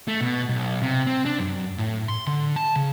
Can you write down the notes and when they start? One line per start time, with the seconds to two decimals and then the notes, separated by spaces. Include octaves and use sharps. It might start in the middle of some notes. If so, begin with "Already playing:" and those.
0.08 A3
0.21 B2
0.49 B1
0.82 C3
1.07 C4
1.25 D4
1.39 F#2
1.78 A2
2.08 C6
2.27 D3
2.56 A5
2.76 C#3